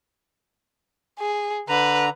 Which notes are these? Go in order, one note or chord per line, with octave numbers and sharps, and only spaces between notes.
G#4
D3 B4 A#5